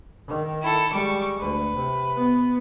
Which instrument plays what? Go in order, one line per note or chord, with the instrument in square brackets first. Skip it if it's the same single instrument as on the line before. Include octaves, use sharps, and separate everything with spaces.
[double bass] D#3
[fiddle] E4 A4
[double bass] G3 G#3 [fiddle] C#6 D6
[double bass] D2 [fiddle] B4
[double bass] C3
B3